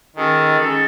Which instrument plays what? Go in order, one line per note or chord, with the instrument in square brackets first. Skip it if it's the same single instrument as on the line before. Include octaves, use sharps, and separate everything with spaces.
[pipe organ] D#3 [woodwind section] G#3 C#4 F#4 A4
[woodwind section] G#3 C#4 F#4 A4